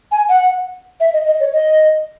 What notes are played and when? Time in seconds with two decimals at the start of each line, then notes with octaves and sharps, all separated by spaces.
0.12 G#5
0.29 F#5
1.00 E5
1.13 D#5
1.26 D#5
1.40 C#5
1.53 D#5